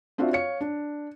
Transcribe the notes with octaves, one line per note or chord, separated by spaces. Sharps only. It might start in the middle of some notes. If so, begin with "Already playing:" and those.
C4 D4 F4 F#4 D5 E5
C#5 F5 C#7
D4